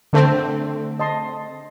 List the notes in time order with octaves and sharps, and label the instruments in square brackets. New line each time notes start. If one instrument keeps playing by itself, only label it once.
[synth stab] D3 A3 C4 [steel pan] D4 A4 C5
[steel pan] D#5 A5 C6